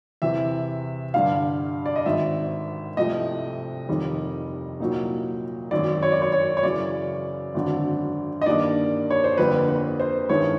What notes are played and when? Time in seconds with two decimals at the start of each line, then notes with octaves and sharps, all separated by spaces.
0.22 E2 C3 E3 E5
1.14 G1 G2 D3 G3 F5
1.86 D5
1.96 D#5
2.06 G#1 G#2 D#3 E5
2.97 C2 C3 F3 A3 D#5
3.89 F1 D#2 D#3 G3
4.80 C2 A#2 F#3 A#3 D#4
5.71 G#1 F#2 D#3 D5
6.03 C#5
6.12 D5
6.22 C#5
6.32 C#5
6.57 C#5
6.63 F#2 C#3 E3 D5
7.54 G#1 F#2 D3
8.42 D#5
8.46 G2 D#3 G3 A#3 D4 D5
9.10 C#5
9.24 C5
9.38 G1 F2 D3 G3 A#3 B4
9.69 B4
10.00 C5
10.29 G2 D#3 G#3 B3 E4 C#5